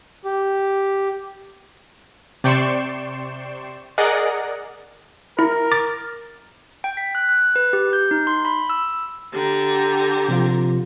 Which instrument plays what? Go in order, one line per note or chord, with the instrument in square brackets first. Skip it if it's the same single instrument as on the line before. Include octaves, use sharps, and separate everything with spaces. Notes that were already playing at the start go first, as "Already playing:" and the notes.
[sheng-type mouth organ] G4
[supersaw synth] C3 D5 G5 C6 C#6 E7
G#4 A#4 D5 D#5 F#5
[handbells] E4 [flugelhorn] A#4
[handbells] D6 A6
G5
B6
F#6
F#6
B4
G4
G6
D#4
C6
B5
E6
[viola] D3 A#5 [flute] G4
[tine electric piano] C3 F3 F4